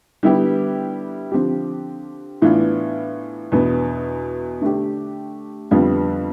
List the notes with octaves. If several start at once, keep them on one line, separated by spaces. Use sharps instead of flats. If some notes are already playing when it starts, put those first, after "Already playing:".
D3 G3 B3 E4 G4
D3 F3 C4 G4
A2 E3 B3 D4 F4
E2 B2 B3 D4
D3 A3 D4 G4
F2 D3 G3 B3 F4